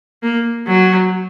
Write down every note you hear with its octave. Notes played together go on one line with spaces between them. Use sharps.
A#3
F#3